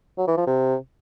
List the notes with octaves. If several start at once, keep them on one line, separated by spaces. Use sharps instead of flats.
F#3
E3
F3
C3